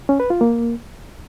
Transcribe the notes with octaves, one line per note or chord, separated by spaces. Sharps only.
C#4
B4
F4
A#3